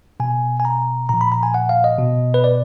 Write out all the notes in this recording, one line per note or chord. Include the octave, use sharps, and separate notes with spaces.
B2 G#5
G#5
A#5
A#2 F3 A#5
B5
A#5
G#5
F#5
F5
D#5
B2
B4
D5